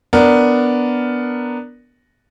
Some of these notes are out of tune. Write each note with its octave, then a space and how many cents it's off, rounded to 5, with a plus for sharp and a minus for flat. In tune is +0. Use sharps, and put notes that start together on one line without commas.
B3 +0 D4 -5 A#4 +0